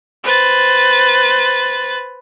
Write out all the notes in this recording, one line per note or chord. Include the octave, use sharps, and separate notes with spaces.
B4 C5 A6